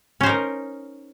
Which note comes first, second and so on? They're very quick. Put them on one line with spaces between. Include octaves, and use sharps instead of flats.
C#4 C5 D#4 A#4